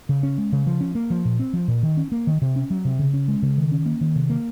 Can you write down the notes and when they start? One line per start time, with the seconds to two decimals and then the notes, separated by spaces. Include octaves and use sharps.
0.09 C#3
0.23 C#4
0.38 G#3
0.52 C#3
0.67 F3
0.81 C#4
0.95 A#3
1.10 F3
1.25 A#2
1.40 C4
1.53 F3
1.68 A#2
1.83 D#3
1.97 C#4
2.12 A#3
2.27 D#3
2.42 C3
2.56 C#4
2.70 F#3
2.85 C3
2.99 C#3
3.13 C#4
3.28 G#3
3.43 C#3
3.58 D#3
3.72 C#4
3.86 A#3
4.01 D#3
4.16 C3
4.30 A#3